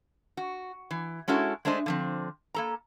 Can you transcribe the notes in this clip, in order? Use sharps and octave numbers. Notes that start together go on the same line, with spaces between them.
F#4
E3
G#3 C#4 E4 F#4 A4
G#3 A3 D4 C5 D#5
D3 F3 C4
A#3 A4 A#5